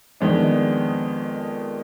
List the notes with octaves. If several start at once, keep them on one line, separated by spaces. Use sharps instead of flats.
F2 D#3 G#3 B3 D4